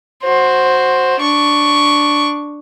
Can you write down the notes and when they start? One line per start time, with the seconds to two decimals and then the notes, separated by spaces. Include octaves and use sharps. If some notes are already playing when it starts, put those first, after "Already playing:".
0.23 F#4 C5
1.20 D4 C#6